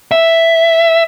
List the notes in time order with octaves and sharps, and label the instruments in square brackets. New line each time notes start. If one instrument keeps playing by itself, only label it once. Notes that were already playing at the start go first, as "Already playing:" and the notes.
[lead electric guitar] E5